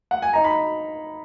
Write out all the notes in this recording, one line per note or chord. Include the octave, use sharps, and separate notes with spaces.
F#5
G#5
D#4 A#5
B5